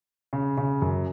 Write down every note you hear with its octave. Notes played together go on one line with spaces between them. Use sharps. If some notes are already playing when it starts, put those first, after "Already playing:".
C#3
C#3
F#2